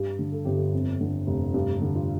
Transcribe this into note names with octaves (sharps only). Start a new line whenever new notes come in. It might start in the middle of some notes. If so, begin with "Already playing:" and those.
Already playing: G2 G4
D3
A4
G1 G4
A4
F2
D3
F1
G2 G4
D3
F4